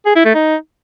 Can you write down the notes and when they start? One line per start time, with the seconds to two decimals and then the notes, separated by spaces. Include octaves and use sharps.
0.06 G#4
0.15 E4
0.25 A3
0.35 D#4